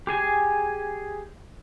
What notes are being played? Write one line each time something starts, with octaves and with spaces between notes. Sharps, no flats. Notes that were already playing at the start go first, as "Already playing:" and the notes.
G4 G#4 G#5